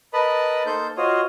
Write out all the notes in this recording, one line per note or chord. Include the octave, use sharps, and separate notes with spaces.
A#4 B4 D#5 A5 B5
A#3 D#4 A4 C5 G6
F4 F#4 C5 C#5 D#5